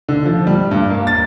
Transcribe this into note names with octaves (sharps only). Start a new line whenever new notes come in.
D3
F3
G3
G2
A#3
A6